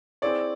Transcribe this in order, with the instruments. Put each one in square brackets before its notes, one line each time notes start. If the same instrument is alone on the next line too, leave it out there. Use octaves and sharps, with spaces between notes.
[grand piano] C4 E4 G#4 C#5 [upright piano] D5